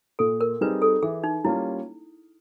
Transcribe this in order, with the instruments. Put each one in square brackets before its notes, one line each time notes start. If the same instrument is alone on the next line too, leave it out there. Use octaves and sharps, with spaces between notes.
[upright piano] A#2 [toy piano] A4
[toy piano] A#4
[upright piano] G3 C4 D#4 G#4 [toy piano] B4
[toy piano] A4
[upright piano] E3 [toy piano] G#4
[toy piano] D#4
[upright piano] G3 A#3 C#4 F4 [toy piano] E4